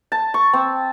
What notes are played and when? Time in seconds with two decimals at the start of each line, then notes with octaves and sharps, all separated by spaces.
0.12 A5
0.34 C#6
0.53 C4